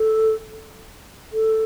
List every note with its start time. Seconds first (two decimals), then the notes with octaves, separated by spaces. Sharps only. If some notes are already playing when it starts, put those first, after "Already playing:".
Already playing: A4
1.33 A4